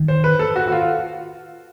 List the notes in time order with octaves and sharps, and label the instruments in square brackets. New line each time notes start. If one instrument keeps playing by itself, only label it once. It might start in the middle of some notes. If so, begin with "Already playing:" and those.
Already playing: [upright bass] D#3
[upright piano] C5
B4
A4
F#4
F#4
F4